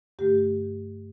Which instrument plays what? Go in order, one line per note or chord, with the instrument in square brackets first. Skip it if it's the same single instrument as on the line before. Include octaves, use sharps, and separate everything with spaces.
[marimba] G2 D3 A3 G4